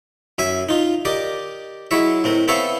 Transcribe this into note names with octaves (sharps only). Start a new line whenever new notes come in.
F#2 E5 G#5
D#4 F4
G4 A#4 D5 D#5
F#3 G#3 E4 C#5 E5
A2 C4 A#4
B3 C4 A4 C#5 E5 F5